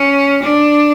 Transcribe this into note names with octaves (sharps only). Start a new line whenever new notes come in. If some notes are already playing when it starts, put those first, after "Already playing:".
Already playing: C#4
D4